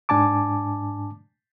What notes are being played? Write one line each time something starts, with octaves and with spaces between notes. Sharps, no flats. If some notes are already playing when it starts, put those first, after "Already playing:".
G#2 D4 G#5 A5 D6